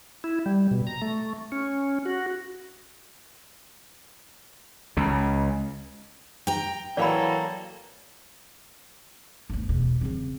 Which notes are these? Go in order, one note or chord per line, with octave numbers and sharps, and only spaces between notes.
E4
G3
B2
A#5
A3
C#4
F#4
C#2 C#3
G5 A#5
E3 F#3 A#3 A4 C#5 D5 F5 B5
G1 D2
E2 B2
C#3 C4